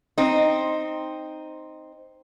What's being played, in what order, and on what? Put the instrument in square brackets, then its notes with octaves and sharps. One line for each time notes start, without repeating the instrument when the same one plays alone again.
[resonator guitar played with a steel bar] C4 D#4